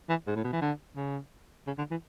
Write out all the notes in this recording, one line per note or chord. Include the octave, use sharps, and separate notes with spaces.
E3
G#2
A2
B2
E3
D3
C#3
C#3
D3
E3